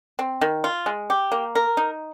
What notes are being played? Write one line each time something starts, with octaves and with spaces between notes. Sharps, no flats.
C4
D#3
F4
G#3
G4
A#3
A#4
D#4